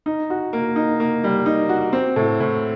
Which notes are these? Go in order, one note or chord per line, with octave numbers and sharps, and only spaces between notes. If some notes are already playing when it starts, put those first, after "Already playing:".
D#4
F#4
A#3
D#4
A#3
G3
D#4
F#4
C4
A2
A2